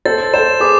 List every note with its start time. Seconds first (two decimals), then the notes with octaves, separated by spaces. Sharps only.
0.05 A4 C5 A6
0.33 A4 C5 E7
0.60 G#4 B4 D6